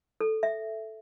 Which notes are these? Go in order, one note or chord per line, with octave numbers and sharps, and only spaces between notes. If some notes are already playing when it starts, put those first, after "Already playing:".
A4
E5